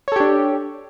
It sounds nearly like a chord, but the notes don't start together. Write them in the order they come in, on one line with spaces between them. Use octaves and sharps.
C#5 A4 G4 D4